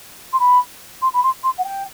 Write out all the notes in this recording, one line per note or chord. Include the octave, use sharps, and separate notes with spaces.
C6
B5
C6
B5
C6
C6
F#5
G5